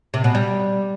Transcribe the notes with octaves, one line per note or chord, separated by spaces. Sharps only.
C3
B2
G3